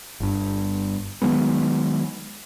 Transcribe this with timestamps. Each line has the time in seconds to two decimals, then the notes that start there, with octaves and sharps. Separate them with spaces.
0.20 G1 G2
1.22 D#3 F#3 G#3 B3